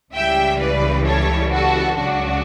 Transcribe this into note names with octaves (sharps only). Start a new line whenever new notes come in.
C#2 C#3 E3 G3 E5 G5
B4 D5
A4 C#5
F#4 A4
C#2 C#3 F#3 D4 F#4